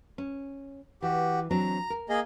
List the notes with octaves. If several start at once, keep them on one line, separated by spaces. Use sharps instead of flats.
C#4
E3 F#4 G4
F#3 C4 D4 A#5
A#4
A#3 G#4 D#5